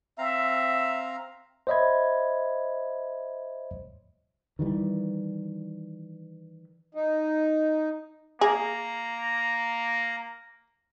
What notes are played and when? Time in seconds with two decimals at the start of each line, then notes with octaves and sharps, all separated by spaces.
0.18 C4 E5 F5 A#5
1.67 C5 C#5 D#5 E5 B5 G#6
4.59 D#3 E3 G3
6.95 D#4
8.41 A#3 G#4 A#5